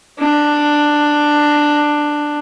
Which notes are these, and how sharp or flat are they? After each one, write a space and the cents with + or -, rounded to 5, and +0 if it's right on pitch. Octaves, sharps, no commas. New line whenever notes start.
D4 +10